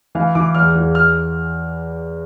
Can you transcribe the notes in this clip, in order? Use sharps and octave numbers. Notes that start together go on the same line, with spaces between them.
E3 F5
E3 D6
E2 F6
E2
F6